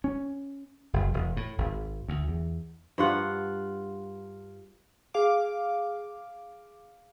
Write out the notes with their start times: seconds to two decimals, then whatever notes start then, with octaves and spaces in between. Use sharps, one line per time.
0.04 C#4
0.93 F#1
1.14 E1
1.37 A2
1.58 G#1
2.09 D2
2.28 E2
2.98 G2 F4 F#5
5.14 G#4 F5 D6